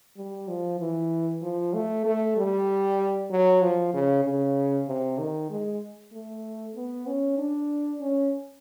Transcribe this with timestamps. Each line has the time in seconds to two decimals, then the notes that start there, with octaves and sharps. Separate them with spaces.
0.17 G3
0.48 F3
0.80 E3
1.42 F3
1.74 A3
2.05 A3
2.37 G3
3.31 F#3
3.62 F3
3.94 C#3
4.24 C#3
4.88 C3
5.19 D#3
5.50 G#3
6.13 A3
6.76 B3
7.07 C#4
7.38 D4
8.01 C#4